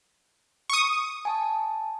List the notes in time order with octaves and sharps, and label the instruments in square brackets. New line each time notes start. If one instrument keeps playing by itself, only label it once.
[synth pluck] C#6 D#6
[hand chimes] G#5 A5